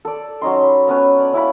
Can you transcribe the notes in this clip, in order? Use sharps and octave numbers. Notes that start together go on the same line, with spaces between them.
A4 D5
F#3 C#4 D#4 C6
B5
B3 C#4 B4 C#5
D5
C#4 E4 F5 B5